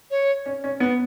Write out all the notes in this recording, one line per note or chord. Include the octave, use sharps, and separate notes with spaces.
C#5
C#4
C#4
B3 B4